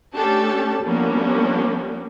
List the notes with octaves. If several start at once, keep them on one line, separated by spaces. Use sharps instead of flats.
A3 C#4 D4 G4 A4 A5
F3 G3 A#3 B3 C#4 D4